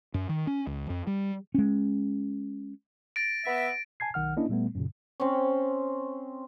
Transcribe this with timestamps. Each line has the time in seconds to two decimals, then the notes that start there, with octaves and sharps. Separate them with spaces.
0.14 F#2
0.29 D#3
0.47 C#4
0.67 C#2
0.90 F2
1.07 G3
1.54 G#3 C#4
3.16 A6 A#6 D7
3.45 B3 E5
4.00 G#5 A5 G#6 C7
4.14 B1 D#3 F#5 F6
4.37 A#3 C#4 D4 E4 D#5
4.49 A#2 G3 A3 B3
4.75 F#2 A#2 C#3
5.20 C4 C#4